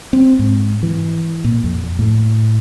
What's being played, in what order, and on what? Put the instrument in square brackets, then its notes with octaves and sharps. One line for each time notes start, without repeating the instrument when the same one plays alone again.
[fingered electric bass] C4
G#2
E3
A#2
F2
A2